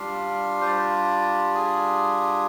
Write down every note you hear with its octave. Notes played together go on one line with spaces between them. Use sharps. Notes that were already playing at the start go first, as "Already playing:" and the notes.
Already playing: G3 D4 F4 F5
C5
D5
G#4